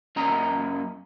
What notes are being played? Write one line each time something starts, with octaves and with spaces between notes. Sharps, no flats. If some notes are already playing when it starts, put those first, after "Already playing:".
F#2 A#3 C#4 D#5 A#5